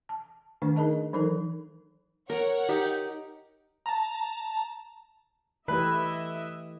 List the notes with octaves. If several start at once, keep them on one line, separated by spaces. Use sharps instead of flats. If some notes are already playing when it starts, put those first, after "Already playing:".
A5
D#3 A3 D4 B4
D#4 G#4 A#4 D#5 A5
E3 F#3 D#4 A4 A#4
A#4 C#5 F#5
D#4 G4
A5 A#5
E3 A3 E4 G4 B4 D#5 E5